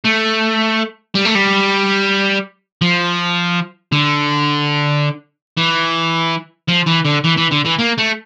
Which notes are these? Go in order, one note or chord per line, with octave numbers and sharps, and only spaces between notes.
A3
G3
A3
G3
F3
D3
E3
F3
E3
D3
E3
E3
D3
E3
A#3
A3